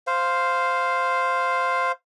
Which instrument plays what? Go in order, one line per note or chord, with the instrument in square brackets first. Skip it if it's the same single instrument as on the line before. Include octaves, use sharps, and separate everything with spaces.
[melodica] C5 F5